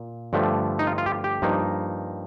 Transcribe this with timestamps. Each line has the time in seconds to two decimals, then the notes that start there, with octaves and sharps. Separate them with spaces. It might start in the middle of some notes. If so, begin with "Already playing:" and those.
Already playing: A#2
0.33 G2 D3 F3 A3
0.79 D#4
0.87 F4
0.98 F4
1.06 G4
1.24 G4
1.42 G2 F3 A#3 D#4